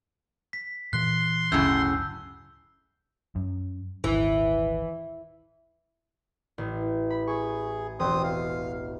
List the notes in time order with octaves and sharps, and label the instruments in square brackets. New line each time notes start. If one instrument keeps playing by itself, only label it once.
[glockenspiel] B6
[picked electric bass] A#2 E3 [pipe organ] C6 [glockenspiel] F#6
[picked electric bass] D1 G1 [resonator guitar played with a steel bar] F#2 A2 C#3 [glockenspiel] E6 G6
[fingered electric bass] F#2
[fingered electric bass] D#1 G#1 D#2 [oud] E3
[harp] A1
B5
[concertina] G#4 [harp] C#6
[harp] E1 [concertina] C4 C5 D#6
[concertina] F5